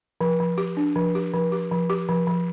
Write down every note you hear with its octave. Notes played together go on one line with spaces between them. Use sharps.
F3
F3
G4
D4
F3
G4
F3
G4
F3
G4
F3
F3